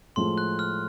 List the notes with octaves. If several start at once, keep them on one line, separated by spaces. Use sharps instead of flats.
A2 F3 G#3 C6
F#6
F6